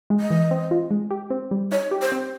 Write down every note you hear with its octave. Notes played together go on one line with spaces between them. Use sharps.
G#3
D#5
E3
C4
F4
G#3
G4
C4
G3
D#4 C#5
G4
C5
C4